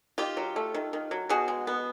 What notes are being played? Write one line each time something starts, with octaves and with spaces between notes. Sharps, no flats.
D#3 F4 G4
F#3
A3
D#3
D#3
F#3
B2 F#4 G#4
G#3
B3